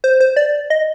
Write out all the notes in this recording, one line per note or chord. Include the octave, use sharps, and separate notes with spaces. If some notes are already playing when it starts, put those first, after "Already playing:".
C5
C5
D5
D#5